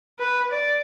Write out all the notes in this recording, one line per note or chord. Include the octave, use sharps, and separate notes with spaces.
B4
D5